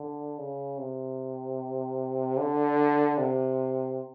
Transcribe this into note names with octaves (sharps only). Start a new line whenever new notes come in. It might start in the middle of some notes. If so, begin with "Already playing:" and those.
Already playing: D3
C#3
C3
D3
C3